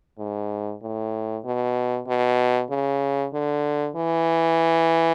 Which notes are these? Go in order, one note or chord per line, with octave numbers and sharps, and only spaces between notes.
G#2
A2
B2
B2
C#3
D3
E3